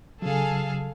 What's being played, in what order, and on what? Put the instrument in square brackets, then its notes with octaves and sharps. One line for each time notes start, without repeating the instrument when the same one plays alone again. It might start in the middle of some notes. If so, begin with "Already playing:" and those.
[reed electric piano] C#3 F#3 [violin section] G#4 A4 F5